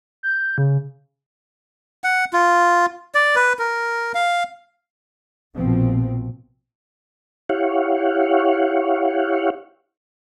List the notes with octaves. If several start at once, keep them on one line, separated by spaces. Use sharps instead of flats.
G6
C#3
F#5
F4
D5
B4
A#4
F5
A#1 B2 F3 C4
E4 G4 C#5 F5 F#5